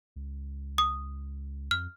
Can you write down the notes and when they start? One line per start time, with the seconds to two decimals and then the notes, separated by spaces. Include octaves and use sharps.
0.16 C#2
0.78 D#6
1.71 F2 F6